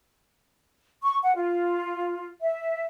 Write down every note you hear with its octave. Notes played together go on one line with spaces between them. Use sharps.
C#6
F#5
F4
E5